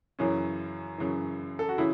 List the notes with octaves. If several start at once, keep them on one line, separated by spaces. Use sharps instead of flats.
F#2 C#3 E3 C#4
F#2 C#3 E3
A4
F#4
C#3 E3 E4